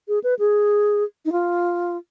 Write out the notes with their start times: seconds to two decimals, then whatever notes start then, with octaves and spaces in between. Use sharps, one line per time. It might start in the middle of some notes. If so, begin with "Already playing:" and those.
0.08 G#4
0.24 B4
0.39 G#4
1.25 D#4
1.32 F4